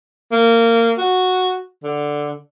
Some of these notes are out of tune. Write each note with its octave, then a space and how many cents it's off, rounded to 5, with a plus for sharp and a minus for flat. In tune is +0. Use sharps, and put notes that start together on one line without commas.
A#3 -20
F#4 -5
D3 +0